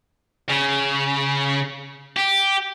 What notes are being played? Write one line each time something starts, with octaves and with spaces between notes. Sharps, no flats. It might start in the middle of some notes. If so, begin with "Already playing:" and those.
C#3
G4